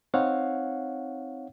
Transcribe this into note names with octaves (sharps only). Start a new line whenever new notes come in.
C4 D#4 C#5 F5 F#5